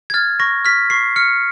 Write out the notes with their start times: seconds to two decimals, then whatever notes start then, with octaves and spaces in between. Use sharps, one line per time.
0.10 G#6
0.14 F6 A6
0.40 C#6 A#6
0.65 F6 B6
0.90 C#6 C7
1.16 F6 C#7